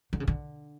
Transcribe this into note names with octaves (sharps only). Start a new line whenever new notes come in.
D3
C#3
D3